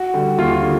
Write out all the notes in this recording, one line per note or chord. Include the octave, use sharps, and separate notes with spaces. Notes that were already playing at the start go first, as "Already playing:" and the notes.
Already playing: F#4
D3 G3
D#2 F4
D3